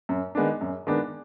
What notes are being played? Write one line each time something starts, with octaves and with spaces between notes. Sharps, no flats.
F#2
D#3 G#3 B3 D4
F#2
D#3 G#3 B3 D4